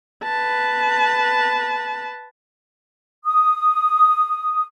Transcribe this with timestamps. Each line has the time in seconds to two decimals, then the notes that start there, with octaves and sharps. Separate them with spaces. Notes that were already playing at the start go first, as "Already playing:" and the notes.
0.24 B4 A5
3.25 D#6